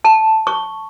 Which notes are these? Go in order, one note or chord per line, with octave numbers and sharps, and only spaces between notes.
A5
C#6